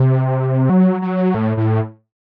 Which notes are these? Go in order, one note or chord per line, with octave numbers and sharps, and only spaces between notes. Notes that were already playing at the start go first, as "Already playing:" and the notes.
Already playing: C3
F#3
F#3
A2
A2